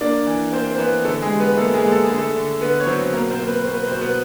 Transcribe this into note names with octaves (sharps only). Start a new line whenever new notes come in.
A#3 D4 D5
E3
A#3 C4 C5
C5
E3 B3 B4
D3 A3 A4
G#3 G#4
G3
B3 B4
A3 A#3 A4
G#3 G#4
A#3
A4
D3 G#4
A3 A4
D3
D3 B3 B4
C#5
F#3 C4 C5
B2 A#3 A#4
C4 C5
A#3
B4
A#3 C5
B4
B2 C5
B3 B4